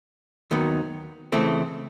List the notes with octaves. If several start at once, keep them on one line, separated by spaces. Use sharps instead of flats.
D#2 D#3 F#3 B3
C#2 C#3 E3 A3 C4